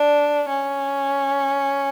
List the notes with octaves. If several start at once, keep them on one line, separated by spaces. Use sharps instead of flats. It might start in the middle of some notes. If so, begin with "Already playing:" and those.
Already playing: D4
C#4